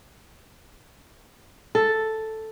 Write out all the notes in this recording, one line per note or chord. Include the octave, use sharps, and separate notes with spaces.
A4